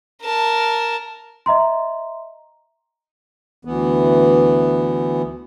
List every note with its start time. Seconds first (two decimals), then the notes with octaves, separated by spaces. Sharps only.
0.22 A#4 A5
1.46 D#5 E5 A#5 C6
3.65 D2 E3 B3